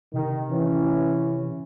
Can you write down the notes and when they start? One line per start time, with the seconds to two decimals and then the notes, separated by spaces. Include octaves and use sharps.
0.14 C3 D#3
0.50 E3 C#4